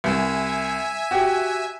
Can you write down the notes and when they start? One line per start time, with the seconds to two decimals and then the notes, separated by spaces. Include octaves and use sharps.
0.04 C2 E5 G#5 E6
1.11 F#4 G4